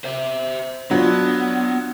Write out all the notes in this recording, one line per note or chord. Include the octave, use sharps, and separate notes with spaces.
C5 E5
F#3 B3 D4 F4 C#5